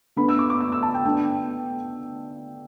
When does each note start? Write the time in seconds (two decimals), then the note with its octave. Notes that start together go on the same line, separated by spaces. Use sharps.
0.16 D3 B3 D4 B5
0.29 E6
0.39 D6
0.50 D6
0.60 E6
0.72 E6
0.83 A5
0.94 G5
1.05 D3 B3 D4 G5